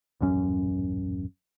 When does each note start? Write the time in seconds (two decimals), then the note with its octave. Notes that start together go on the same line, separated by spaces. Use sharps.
0.21 D#1 A1 F#2 C#4